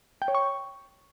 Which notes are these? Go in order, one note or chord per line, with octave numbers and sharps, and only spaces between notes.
G5
C#5
C#6